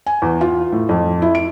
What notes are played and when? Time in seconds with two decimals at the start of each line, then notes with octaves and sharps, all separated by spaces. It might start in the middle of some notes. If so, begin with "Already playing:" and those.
0.07 G#5
0.22 E2
0.41 F4
0.72 A2
0.89 F2
1.22 E4
1.35 D7